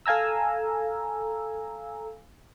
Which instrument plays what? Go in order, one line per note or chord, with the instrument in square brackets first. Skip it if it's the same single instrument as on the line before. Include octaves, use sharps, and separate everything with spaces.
[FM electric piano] A4 F5 G#5 A#5 E6